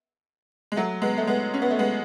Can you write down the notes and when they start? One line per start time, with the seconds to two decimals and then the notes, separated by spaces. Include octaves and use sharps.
0.72 G#3
0.76 F#3 A3
1.02 G#3 B3
1.18 A3
1.27 G#3 B3
1.54 C#4
1.62 B3
1.71 A3
1.79 G#3 B3